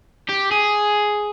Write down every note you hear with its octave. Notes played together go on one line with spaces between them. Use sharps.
G4
G#4